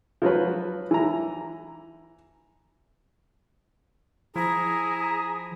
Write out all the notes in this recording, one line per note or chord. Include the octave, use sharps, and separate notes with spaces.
F3 F#3 F#4 B4
E3 A#5
F3 E4 G#4 A#5